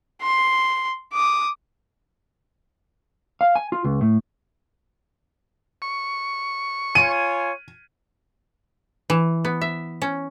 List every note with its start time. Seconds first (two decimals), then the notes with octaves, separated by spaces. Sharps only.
0.22 C6
1.13 D6 D#6
3.41 F5
3.56 G#5
3.72 F4
3.84 C#2
4.01 A2
5.82 C#6
6.95 F4 C#5 G#5 D#7
9.10 E3
9.45 B3
9.61 E5
10.02 C#4